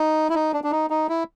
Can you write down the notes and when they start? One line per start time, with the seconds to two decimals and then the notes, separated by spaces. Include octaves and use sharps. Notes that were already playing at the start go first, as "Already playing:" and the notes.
Already playing: D#4
0.30 E4
0.35 D#4
0.53 D4
0.64 D4
0.72 D#4
0.90 D#4
1.09 E4